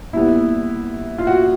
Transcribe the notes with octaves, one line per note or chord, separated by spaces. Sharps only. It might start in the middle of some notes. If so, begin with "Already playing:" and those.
A#2 G3 B3 E4
F4
F#4